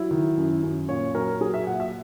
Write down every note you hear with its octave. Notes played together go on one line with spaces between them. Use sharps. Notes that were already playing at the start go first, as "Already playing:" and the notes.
Already playing: F#3 E4
D#3
F#2
F#2
A#2 C#5
F#3 A#4
F#3 G#4
E5
A#2 F#5
E5